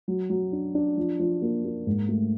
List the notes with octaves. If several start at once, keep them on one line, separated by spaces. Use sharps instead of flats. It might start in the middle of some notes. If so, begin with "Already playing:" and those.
F#3
F#3
D4
D4
F3
F3
A#3
A#3
G#2
A3